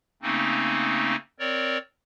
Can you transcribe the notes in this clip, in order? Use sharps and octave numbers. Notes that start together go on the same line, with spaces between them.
C#3 A3 A#3 C4 C#4 D#4
C4 A#4 C#5 D5